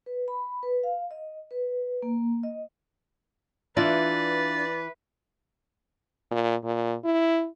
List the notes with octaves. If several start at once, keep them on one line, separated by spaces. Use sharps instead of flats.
B4
B5
B4
F5
D#5
B4
A#3
D#5
E3 D4 F4 B4 D5
A#2
A#2
E4